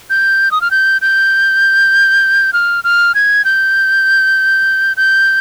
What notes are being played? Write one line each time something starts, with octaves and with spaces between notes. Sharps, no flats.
G6
D#6
F6
G6
G6
F6
F6
G#6
G6
G6